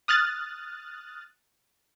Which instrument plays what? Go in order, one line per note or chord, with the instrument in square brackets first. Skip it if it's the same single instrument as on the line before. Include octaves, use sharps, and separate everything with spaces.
[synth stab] D#6 F6 F#6 A6